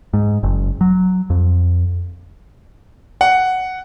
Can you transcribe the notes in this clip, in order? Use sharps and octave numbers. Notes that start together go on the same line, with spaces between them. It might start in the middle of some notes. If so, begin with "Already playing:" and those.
G#2
F#1
F#3
F2
F#5